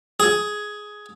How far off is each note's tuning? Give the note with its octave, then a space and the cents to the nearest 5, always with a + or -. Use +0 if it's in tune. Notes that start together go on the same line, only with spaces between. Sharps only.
G#4 +10